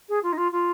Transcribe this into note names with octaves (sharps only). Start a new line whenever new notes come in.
G#4
F4
D#4
F4
F4